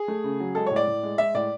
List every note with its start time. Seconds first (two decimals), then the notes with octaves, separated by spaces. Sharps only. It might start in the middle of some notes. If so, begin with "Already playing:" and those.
Already playing: G#4
0.08 A3
0.24 C#3
0.40 F#3
0.55 G#3 A4
0.67 A2 C#5
0.76 D5
0.87 A2
1.03 G#3
1.18 G#3 E5
1.34 A2 D5